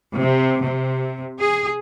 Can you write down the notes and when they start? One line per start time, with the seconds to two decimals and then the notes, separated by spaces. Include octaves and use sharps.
0.17 C3
0.63 C3
1.39 G#4